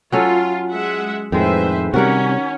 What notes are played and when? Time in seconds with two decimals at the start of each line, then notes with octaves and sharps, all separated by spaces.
0.12 F#3 C#4 F4 A4
0.71 G#3 E5 F#5
1.32 F2 A2 D#3 G#3 B4 C5 E5
1.94 C3 G3 C#4 F#4 A#4 F#5